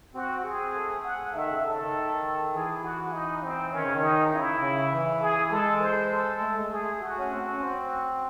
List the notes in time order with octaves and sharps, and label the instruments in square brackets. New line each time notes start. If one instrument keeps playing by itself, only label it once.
[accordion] C4 [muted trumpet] F#4
[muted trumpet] G#4
[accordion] A3
[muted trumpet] F#5
[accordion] D#3 [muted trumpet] E5
[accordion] C#3
[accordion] C#3 [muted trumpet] A4
[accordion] D#3
[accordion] E3 [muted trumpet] G#4
[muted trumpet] F#4
D#4
C4
[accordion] D#3 [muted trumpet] C#4
[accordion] C#3
D#3
[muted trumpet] D#4
[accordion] C#3 [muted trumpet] E4
[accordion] C#3
E3
[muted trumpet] G#4
[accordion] G#3 [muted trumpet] A4
[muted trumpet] C5
A4
[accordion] A3
G#3
[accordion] A3 [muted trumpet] G#4
[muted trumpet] F#4
[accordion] C#4
C4
C#4
C4